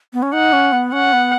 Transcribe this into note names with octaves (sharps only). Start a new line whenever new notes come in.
B3
C#4
D#4 F#5
C#4
B3
C#4 F#5
B3